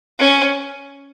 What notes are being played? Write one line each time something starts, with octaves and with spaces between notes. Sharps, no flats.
C#4